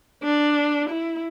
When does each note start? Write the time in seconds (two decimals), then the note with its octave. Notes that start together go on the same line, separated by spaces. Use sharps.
0.23 D4
0.89 E4